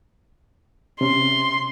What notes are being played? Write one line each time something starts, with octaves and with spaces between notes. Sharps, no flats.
C3 C#4 C6